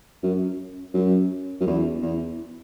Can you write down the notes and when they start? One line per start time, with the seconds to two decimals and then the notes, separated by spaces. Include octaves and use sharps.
0.23 F#2
0.94 F#2
1.60 F#2
1.66 E2
2.02 E2